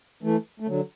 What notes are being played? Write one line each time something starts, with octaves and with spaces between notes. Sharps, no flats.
E3 A3
A3
D3 F#3